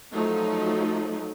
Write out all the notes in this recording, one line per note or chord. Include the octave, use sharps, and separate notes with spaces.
F3 F#3 A3 D#4